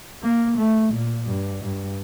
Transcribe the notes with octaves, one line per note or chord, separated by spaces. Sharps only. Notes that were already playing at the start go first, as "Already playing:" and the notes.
A#3
A3
A#2
G2
G2